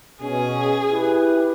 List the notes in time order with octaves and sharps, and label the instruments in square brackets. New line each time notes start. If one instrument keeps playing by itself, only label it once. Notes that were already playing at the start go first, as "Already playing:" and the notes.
[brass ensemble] B2 C#4 [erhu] G#4
[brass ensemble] E4 G4 B4